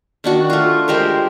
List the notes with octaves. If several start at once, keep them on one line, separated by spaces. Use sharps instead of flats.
D#3 D4 F#4
A3 F4
G#3 G4 A#4 C5